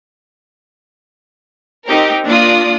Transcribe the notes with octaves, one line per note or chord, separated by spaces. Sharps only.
C4 D#4 G4 A#4
A#3 D4 F4 D5 D#6